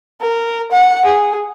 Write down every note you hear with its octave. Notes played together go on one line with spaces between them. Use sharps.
A#4
F#5
G#4